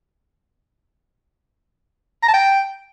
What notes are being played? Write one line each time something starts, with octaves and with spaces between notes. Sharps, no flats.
A#5
A5
G5